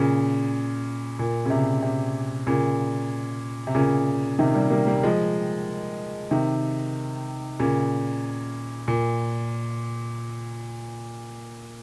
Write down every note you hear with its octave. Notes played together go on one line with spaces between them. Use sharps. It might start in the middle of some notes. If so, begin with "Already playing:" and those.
Already playing: A#2 C#3
A#2
C#3
C3
C3
A#2 C#3
C3
A#2 C#3
C3 D#3
G3 A#3
G3 A#3
G3 A#3
F3 G#3
C3 D#3
A#2 C#3
A#2